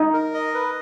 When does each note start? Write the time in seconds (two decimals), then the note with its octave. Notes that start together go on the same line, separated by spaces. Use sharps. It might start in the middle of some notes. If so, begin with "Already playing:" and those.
Already playing: D#4
0.13 A#4
0.34 D#5
0.54 B4